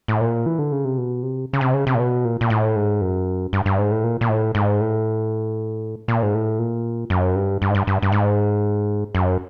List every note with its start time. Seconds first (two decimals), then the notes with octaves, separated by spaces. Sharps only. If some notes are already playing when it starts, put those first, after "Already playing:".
0.08 A2
0.21 A#2
0.46 E3
0.59 D3
0.72 C#3
0.85 C3
0.97 B2
1.23 C3
1.53 C#3
1.61 C3
1.73 C#3
1.87 C3
1.95 A#2
1.99 B2
2.25 A#2
2.41 A#2
2.50 A2
2.76 G#2
3.01 F#2
3.53 G2
3.66 G2
3.78 G#2
3.91 A2
4.04 A#2
4.21 A#2
4.29 A2
4.55 G#2
4.80 A2
6.08 A#2
6.23 G#2
6.34 A2
6.59 A#2
7.10 F#2
7.36 G2
7.62 G2
7.70 G#2
7.75 G2
7.87 G2
8.02 G2
8.12 G#2
9.15 F#2